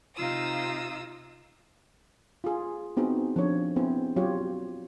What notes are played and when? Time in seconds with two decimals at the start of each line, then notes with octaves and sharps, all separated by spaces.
0.16 C3 D#4 F4 F5 D#6 E6
2.44 F4 G#4
2.97 B3 C4 D#4 F#4 G#4
3.36 F3 D4 C#5
3.76 B3 C4 E4 G#4
4.16 F#3 F4 G4 C#5